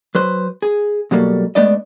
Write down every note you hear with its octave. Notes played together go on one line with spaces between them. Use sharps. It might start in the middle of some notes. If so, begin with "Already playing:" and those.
F#3 B4 C5
G#4
B2 F#3 G3 A#3 A4
G#3 A3 B3 D4 D5 D#5